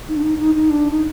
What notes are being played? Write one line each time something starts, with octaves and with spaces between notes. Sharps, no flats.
D#4
D4
D#4
D#4
D#4
D4
D#4